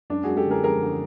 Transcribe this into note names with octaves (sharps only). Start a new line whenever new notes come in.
F#2 D4
F#2 F#4 G#4
G4 A4
D3 G#4 A#4
F3 G#4 A#4
D3